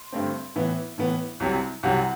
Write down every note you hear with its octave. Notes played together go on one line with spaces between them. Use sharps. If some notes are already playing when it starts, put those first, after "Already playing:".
Already playing: C6
G2 D3 A3 C4
A2 E3 B3 E5
A2 E3 B3
C2 C3 F#3
C2 C3 F#3 F#5